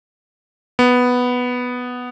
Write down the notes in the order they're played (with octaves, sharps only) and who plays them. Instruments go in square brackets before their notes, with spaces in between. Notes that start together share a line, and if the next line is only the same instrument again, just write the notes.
[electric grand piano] B3